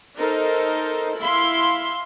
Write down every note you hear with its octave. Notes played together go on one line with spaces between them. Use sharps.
D#4 A4 A#4 C5
E4 E5 F5 C6